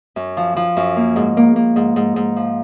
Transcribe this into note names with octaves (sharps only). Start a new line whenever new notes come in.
F#2
F3
F3
F#2
A#3
G#2
A#3
A#3
G#2
G#2
G#2
F3